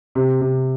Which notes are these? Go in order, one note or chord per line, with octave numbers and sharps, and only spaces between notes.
C3
C3